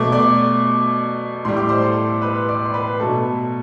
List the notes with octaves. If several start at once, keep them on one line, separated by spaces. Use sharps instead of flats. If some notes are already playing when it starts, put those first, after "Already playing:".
Already playing: B2 F#3 A3 D6
D5 D6
A2 G3 C6
D6
C5 C6
A4 A5
B4 B5
D5 D6
C6
B4 B5
B2 F#3 A3 A4 A5